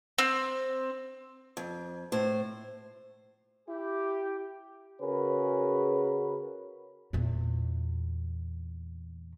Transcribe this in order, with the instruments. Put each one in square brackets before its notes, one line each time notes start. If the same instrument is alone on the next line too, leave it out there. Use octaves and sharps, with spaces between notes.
[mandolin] C4
[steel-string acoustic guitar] F2
A2 C5
[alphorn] E4 [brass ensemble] G4
[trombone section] C#3 C#4 F#4 G#4 A#4 B4
[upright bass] E2 A#2